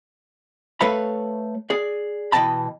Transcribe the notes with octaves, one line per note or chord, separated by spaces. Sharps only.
A3 A4 B4 C#5 F5 B5
G#4 D5
B2 E3 D#5 G5 A5 B5